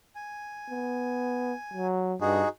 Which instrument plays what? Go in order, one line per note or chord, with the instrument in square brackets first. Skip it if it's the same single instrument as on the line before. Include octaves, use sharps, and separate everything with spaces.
[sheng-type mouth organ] G#5
[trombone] B3
F#3
[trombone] G2 [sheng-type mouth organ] D#4 F#4 G#4